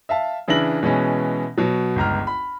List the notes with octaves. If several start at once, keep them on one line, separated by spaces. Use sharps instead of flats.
E5 F5 A5
C#3 E3 D4 E4 A#6 F#7
B2 E3 G#3 C#4
B2 F#3
G1 C#2 A#5 F6
B5